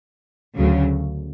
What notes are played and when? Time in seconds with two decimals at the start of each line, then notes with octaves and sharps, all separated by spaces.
0.56 D2 C#3 F#3